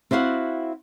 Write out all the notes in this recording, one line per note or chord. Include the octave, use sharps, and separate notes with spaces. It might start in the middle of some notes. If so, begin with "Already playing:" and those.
C4 E4 F#4 F5 F#5